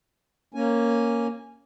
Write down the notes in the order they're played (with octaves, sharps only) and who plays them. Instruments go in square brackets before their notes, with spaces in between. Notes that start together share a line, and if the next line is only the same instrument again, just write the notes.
[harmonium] A#3 C#4 G#5